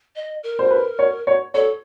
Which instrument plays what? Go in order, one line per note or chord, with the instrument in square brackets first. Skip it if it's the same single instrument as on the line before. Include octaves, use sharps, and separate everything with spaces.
[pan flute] D#5
A#4
[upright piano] C5
B4
C#5
C#5
[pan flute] A4 [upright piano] C#5